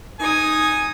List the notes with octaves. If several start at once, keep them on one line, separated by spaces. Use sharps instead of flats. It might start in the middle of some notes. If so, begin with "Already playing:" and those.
D#4 G#5 D#6